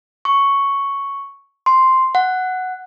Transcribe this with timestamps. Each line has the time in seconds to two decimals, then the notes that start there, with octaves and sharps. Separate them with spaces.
0.25 C#6
1.66 C6
2.15 F#5